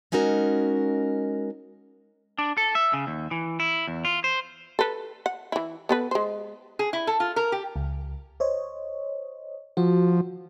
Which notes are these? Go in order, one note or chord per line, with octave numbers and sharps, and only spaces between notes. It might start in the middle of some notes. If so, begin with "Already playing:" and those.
G#3 C#4 D#4 F#4 A#4
D4
A4
E5
C#3
D#2
E3
E4
E2
F4
C5
A4 B4
F#5
E3 E4
B3 A4 B4
G#3 C5
G#4
E4
A4
F4
A#4
G4
C#2
C5 C#5 D#5
F3 F#4